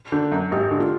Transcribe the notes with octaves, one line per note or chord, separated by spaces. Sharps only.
D3
F#2
G#1 G4
D3
F4